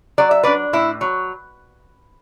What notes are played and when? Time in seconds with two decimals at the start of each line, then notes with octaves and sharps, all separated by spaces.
0.18 F#3 D5
0.31 E5
0.43 D4 B4 D5
0.73 A2 E4
1.01 F#3